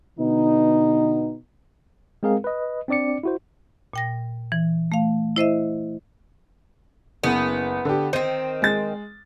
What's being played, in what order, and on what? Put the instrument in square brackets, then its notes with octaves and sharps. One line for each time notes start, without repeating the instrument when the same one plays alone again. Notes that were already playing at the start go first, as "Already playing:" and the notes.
[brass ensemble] B2 D3 B3 D#4
[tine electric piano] G#3 C4 G#4 A#4 F5
B4 D#5
C4 D4 D5 D6 C#7
E4 F#4 C5
[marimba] A#2 G5 A#6
E3
A3 F5
E4 C5 D#5 E5
[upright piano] F#1 [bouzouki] B3
[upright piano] D3 G4
[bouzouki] D#3 C4 [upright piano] C5
[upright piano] G#3 A6